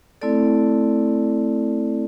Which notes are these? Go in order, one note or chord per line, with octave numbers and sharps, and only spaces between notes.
A3 C4 E4 A4 D5